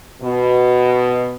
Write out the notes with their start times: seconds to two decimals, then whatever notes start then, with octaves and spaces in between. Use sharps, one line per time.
0.22 B2